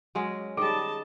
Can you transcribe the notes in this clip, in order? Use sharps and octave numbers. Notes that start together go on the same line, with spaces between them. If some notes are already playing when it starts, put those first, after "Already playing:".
F#3 G#3 C#4
D#3 G3 G#4 D#5 A5